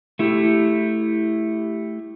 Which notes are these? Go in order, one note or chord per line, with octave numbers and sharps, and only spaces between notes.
A3 E4 G4